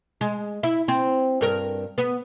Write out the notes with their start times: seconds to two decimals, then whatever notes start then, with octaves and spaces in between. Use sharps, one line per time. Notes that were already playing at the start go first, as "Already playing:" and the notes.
0.21 G#3
0.63 E4
0.88 C4
1.41 G2 A#4
1.98 B3